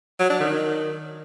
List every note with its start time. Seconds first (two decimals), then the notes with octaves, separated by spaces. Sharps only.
0.20 F#3
0.30 D4
0.40 D#3